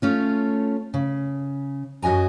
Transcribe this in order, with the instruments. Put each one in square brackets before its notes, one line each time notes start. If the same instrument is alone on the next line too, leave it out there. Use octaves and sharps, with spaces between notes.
[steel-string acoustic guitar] A3 C#4 F4
C#3
F#2 F#4 D#5 G#5 A#5